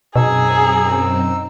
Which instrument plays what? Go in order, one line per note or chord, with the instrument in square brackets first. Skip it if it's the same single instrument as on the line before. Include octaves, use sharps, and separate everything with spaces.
[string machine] F#2 C4 [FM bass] B2 [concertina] D#4 E6 [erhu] G#4